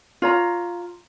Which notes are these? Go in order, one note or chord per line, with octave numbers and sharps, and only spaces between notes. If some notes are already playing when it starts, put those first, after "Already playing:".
F4 C#5 A#5